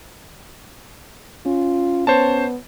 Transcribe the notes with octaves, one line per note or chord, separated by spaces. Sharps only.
C#4 F4
B3 C5 C#5 A5